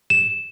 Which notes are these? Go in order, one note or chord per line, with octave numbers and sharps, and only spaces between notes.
E7